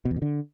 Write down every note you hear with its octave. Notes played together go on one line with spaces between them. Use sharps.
B2
E2
B2
D3